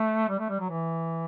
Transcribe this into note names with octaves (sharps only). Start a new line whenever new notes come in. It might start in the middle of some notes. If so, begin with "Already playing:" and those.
Already playing: A3
G3
A3
G3
F#3
E3